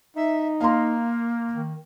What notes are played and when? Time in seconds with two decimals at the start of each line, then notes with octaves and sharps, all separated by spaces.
0.16 D#4 E5
0.61 A#3 F5 A#5 C6
1.53 D#3